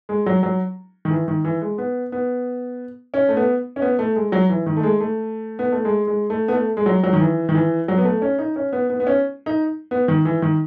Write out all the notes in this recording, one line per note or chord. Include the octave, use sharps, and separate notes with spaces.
G#3
F#3
F#3
D#3
E3
D#3
E3
G#3
B3
B3
C#4
A3
B3
C#4
B3
A3
G#3
F#3
E3
D#3
A3
G#3
A3
B3
A3
G#3
G#3
A3
B3
A3
G#3
F#3
F#3
D#3
E3
D#3
E3
F#3
B3
A3
C#4
D#4
C#4
B3
B3
B3
C#4
D#4
B3
D#3
E3
D#3